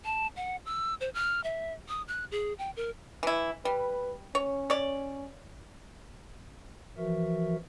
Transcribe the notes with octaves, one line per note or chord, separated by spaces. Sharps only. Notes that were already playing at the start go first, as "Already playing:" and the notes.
A5
F#5
E6
C5
F6
E5
D#6
F#6
G#4
G5
A#4
E3 E4
G3 B4
C#4 C#5
C#5 D5
E3 F3 F#4 A#4 E5